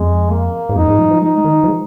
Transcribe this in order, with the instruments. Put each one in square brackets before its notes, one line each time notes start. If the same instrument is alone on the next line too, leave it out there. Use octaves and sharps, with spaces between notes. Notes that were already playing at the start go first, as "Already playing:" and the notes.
Already playing: [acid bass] F2 [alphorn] G#3
[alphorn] A#3
[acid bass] G#2
[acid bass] F2 [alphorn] D#4
[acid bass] G#2
F3
F3
[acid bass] G#3 [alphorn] D#4
[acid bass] D#3
F3
G#3